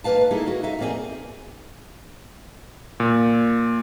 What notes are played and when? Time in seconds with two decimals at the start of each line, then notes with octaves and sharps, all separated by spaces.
0.04 D#2 A#3 C#4 B4 F5 A5
0.31 A#3 D#4 E4 G#4 A4
0.46 A2 F#4
0.63 D#4 E5 F5
0.79 F2 A#2 A#3 C4 G#4 G#5
3.00 A#2